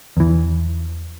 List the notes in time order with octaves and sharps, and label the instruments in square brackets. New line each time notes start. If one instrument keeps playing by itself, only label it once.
[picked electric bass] E2 E3